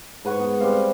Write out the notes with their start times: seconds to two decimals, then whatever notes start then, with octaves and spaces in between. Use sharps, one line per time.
0.25 G#2 B4 F#5 C#6
0.40 B3
0.61 G3 C4 F5